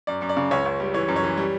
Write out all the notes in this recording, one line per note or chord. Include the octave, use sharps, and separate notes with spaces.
F#2 D5
F#2
D5
C#3
C#2 C#5
C#2
G3
E3 C#5
F#2
C#5
E3
G3